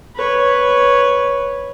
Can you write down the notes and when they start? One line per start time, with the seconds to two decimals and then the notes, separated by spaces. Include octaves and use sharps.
0.16 B4 C#5